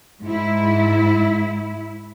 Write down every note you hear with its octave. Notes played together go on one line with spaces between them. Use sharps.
G#2 E4